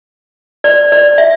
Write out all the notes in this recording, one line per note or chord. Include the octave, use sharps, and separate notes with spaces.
D5
D5
E5